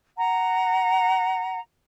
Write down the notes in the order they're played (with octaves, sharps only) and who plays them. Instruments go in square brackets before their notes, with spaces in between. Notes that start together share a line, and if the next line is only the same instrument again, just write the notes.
[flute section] F#5 A#5